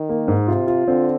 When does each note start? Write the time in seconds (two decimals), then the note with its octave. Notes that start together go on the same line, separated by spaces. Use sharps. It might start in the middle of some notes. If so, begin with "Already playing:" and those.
Already playing: D#3
0.09 A#3
0.28 G#2
0.47 C3 F4
0.67 F4
0.87 D3 C4